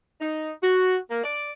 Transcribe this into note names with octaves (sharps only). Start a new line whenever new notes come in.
D#4
F#4
A#3
D5